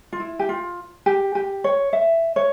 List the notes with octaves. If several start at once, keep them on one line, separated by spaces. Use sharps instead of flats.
F4
E4
G4
F4
G4
G4
C#5
E5
C#5